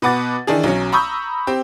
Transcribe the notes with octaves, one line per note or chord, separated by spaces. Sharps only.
B2 B4 F#5 D6 A6
D#3 E3 D4 G#4
B1 F#3 C#4
A#5 B5 C#6 D#6 E6 G6
C4 G4